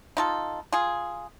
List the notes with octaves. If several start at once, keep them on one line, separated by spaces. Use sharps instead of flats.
D#4 F4 A4
F4 G#4